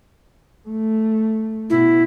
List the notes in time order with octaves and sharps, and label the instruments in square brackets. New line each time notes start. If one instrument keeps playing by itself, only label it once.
[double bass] A3
[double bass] B2 [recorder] E4